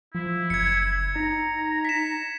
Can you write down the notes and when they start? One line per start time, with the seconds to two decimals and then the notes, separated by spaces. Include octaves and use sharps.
0.15 F3 E4
0.50 F#1 G#6 C#7
1.16 D#4 A#5
1.85 B6 E7